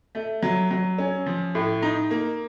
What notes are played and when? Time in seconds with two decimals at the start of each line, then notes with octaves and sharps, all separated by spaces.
0.15 A3
0.43 F#3
0.71 F#3
0.98 C#4
1.26 F3
1.55 A2
1.82 D#4
2.11 A#3